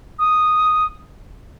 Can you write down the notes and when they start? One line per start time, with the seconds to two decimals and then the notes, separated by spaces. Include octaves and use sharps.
0.19 D#6